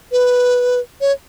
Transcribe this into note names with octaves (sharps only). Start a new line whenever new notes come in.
B4
C#5